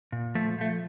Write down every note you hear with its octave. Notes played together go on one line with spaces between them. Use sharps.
A#2
F3 A3
F3 A3